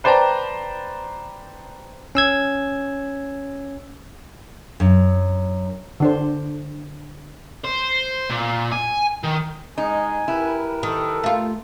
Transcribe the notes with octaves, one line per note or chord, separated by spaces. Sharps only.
B4 C5 D5 G5 A5 A#5
C#4 E6 G#6
F#2
D3 D4 C5
C5
A#2
G#5
D#3
G#3 D#4 G#5
E4 G4 A#4 B4
D#3 A4
A3 F4